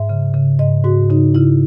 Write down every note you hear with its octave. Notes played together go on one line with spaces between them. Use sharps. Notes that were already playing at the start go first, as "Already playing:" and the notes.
Already playing: G#2 E5
C#3
C#3
G#2 D#5
G#2 F#4
C#3 D#4
C#3 E4